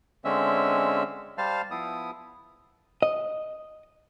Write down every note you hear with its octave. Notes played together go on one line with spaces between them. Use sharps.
D3 G#3 C4 C#4 E5
G3 C5 F5 A5 F6
F3 B3 E4 D#6
D#5